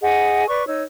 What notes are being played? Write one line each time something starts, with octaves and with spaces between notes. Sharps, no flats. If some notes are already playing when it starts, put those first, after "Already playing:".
G#4 D#5 F#5
B4 D5 C#6
D#4 C#5 E6